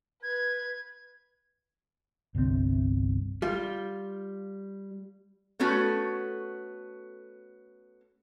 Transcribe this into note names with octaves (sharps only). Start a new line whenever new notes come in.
B4 G#6
G1 C2 D3 C4
G3 F4
A3 B3 C#4 F#4 A4